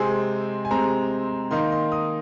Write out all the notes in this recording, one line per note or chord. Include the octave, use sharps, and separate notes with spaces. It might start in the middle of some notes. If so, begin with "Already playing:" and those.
Already playing: C3 G#3 C4 G#5
G#5
C3 G#3 C4 A#5
D#3 A#3 D#4 C6
C6
D#6